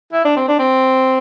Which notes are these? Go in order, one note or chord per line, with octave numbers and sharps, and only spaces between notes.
E4
D4
C4
D4
C4